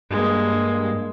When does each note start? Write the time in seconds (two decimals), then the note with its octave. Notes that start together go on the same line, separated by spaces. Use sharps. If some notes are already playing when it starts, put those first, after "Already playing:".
0.10 G2 G#3 A#3